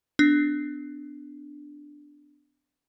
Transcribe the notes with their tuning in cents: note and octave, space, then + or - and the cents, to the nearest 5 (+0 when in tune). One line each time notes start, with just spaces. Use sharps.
B3 +30 D4 +0